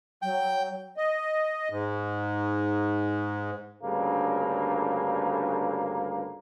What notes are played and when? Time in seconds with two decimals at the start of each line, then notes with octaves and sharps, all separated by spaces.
0.22 F#3 G5
0.97 D#5
1.70 G#2
3.83 D2 G2 C#3 A#3